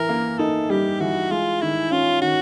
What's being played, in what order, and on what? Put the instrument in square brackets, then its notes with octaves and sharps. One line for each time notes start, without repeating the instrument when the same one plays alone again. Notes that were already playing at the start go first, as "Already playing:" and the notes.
Already playing: [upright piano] E3 [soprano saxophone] A#4
[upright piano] A#3
[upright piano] D#4 [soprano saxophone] A4
[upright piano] G3 [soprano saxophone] G4
[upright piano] E3 [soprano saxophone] F#4
[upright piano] G#3 [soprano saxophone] F4
[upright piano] D#3 [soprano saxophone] E4
[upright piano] C#4 [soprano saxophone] F4
[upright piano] D#3 [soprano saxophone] F#4